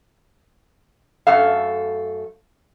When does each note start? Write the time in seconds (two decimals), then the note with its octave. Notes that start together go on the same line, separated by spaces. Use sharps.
1.27 F#2 A3 F5